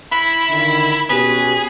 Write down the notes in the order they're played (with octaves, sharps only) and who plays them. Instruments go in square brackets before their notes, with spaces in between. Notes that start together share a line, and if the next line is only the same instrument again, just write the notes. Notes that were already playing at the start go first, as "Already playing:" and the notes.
[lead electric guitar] E4 [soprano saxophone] B5
[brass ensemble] D3 D#3
[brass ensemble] B2 C#4 G4 [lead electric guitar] G#4 [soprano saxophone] B4